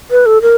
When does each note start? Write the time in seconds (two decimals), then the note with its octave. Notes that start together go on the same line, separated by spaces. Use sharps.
0.11 B4
0.26 A4
0.42 A#4